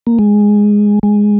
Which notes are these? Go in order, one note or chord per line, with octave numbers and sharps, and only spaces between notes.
A#3
G#3
G#3